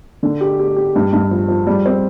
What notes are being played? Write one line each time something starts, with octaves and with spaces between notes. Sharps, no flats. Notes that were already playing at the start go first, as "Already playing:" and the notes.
D3
G4
G4
G4
G2
G2
F3
F3
G3
C4